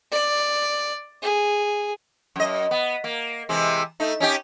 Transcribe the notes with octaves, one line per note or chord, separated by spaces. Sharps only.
D5
G#4
F#2 D#5
B3
A#3
C3 E3 G#3
A3 D#4
C#4 D#4 G4